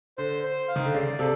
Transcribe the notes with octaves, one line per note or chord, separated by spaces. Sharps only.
D3 C5
C5
F5
D#3
D3
C#3 D5
C3 A4